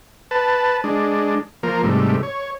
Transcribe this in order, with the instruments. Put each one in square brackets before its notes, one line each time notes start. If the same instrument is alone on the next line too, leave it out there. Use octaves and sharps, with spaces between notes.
[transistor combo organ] B4 A5
G#3 D4
F3 A#3 A#4
G#2 C3 G3 A3
C#5